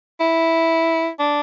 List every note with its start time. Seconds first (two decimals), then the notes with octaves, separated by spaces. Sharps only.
0.20 E4
1.19 D4